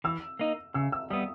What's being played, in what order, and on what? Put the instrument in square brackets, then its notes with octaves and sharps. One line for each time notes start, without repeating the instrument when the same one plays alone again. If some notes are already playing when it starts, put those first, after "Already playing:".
[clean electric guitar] E3 [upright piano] E6
[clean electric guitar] A#3 D#4
[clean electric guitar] C#3 [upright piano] E6
[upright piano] E6
[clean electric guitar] G3 B3 [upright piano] D#6